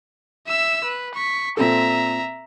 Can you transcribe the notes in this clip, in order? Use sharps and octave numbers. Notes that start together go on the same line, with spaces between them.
E5 E6
B4
C#6 B6
A#2 C4 A4 E5 A#5